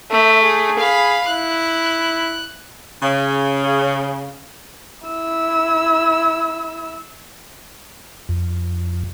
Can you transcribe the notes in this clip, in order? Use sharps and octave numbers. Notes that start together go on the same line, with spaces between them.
A3 E5
G#4
F5 B5
E4 F#6
C#3
E4 E6
F2